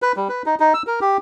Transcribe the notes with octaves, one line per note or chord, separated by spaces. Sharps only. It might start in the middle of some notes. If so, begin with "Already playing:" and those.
B4
G3
B4
D#4
D#4
E6
A#4
G4